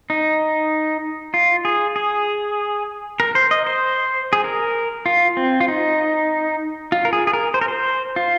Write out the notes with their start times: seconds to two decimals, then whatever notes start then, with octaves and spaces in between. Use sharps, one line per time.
0.10 D#4
1.34 F4
1.65 G#4
1.96 G#4
3.20 A#4
3.35 C5
3.51 D#5
3.67 C5
4.33 G#4
4.44 A#4
5.06 F4
5.37 C4
5.60 F4
5.68 D#4
6.92 F4
7.05 A#4
7.13 G#4
7.27 G#4
7.33 A#4
7.54 C5
7.61 A#4
7.68 C5
8.16 F4